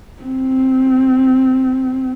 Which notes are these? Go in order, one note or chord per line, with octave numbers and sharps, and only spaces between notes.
C4